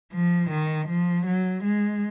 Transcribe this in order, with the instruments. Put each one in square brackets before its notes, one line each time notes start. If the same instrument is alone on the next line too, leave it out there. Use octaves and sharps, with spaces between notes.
[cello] F3
D#3
F3
F#3
G#3